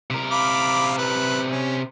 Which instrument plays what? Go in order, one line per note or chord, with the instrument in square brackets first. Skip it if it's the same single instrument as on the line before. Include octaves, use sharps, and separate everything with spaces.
[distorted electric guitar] C3 A#4
[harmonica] F5 B5 D6
B4
C#4